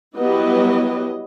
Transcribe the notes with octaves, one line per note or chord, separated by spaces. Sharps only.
F#3 G3 B3 E4 B4 D#5